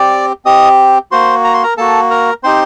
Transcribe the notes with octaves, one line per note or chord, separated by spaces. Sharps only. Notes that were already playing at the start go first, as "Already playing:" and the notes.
Already playing: C4 G4 D5 D6
C4 G4 D#5 D#6
A#3 F#4 C5 C6
A#5
C6
A#4 A#5
A#3 F#4 A4 A5
A#4 A#5
C4 D#4 G4 C5 C6